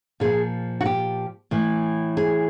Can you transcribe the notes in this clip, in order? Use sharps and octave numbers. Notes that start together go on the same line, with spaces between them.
A#2 F3 G#4
F#4
G4
A2 E3
G#4